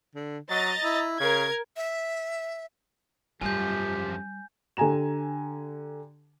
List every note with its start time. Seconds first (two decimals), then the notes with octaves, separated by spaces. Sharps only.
0.15 D3
0.50 F#3 D#5 A#5 A6
0.84 E4
1.20 C#3 A#4 G#6
1.76 E5
3.41 F#2 F3 G3 G4 G#5 G6
4.77 D3 G4 G#5 A#5 E7